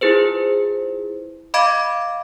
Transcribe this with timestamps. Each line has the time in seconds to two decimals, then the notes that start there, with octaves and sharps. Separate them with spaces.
0.01 E4 F4 G#4 B4 C5
1.54 D#5 F5 B5 D6 G#6 D7